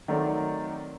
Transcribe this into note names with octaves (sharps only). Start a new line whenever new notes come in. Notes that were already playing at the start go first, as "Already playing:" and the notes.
D#3 F#3 A3 C4 D5